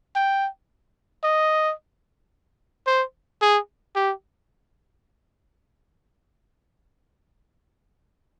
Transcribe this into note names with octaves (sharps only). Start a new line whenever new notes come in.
G5
D#5
C5
G#4
G4